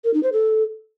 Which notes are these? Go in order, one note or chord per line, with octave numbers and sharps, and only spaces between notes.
A#4
D#4
C5
A4